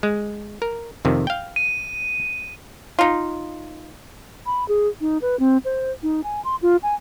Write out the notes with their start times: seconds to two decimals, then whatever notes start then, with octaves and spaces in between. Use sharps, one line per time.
0.03 G#3
0.62 A#4
1.05 F2 C3 D#3
1.27 F5 G5
1.56 D#7
2.99 D#4 F4
4.46 B5
4.68 G#4
5.01 D#4
5.22 B4
5.39 C4
5.65 C5
6.03 D#4
6.24 G#5
6.44 C6
6.62 F4
6.83 G#5